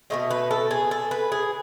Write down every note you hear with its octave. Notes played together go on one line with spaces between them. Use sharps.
B2 F#3 A3 D#5
B4
A4
G#4
A4
B4
G#4